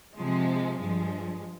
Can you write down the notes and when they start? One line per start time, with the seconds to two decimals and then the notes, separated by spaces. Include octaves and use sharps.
0.18 C3 F3 G#3
0.80 G2 F3 G#3